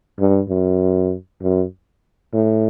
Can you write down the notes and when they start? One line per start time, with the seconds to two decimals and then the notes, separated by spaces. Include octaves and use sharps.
0.20 G2
0.49 F#2
1.42 F#2
2.34 A2